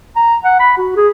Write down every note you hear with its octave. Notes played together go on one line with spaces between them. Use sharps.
A#5
F#5
B5
F#4
G#4